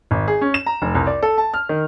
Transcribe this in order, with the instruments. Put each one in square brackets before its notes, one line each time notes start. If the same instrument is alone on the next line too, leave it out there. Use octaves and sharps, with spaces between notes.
[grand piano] G#1
G#4
C#4
E7
A#5
F1
C2
D5
A4
A5
F6
D#3